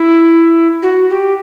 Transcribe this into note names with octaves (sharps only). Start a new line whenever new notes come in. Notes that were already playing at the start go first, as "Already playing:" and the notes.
Already playing: E4
F#4
G4